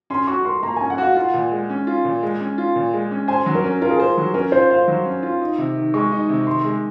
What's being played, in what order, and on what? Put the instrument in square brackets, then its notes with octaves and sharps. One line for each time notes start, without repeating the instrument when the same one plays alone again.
[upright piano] C#4 [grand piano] C6
[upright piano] F#4 [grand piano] C#6
[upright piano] A#4 [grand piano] C6
[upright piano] A#3 [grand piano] A#5
[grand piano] G#5
[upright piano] C#4
[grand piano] F#5
[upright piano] F#4 [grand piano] F5
[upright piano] F4 [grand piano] F#5
[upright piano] A#2
G#3
C#4
F4
A#2
G#3
C#4
F4
A#2
G#3
C#4
[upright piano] C5 [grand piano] G#5
[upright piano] F#3
[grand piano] A#4
[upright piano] C#4
[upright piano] F4 [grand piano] A#4
[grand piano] G#4
[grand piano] A#4 [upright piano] C5
[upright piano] F#3
[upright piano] C#4 [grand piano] A#4
[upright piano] F4 [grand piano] C5
[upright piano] C5 [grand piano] F5
[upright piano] F#3
C#4
F4
D#4
C3
D#3
[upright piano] G#3 [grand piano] C#6
[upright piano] D#4
C3
[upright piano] D#3 [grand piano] C6
[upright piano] G#3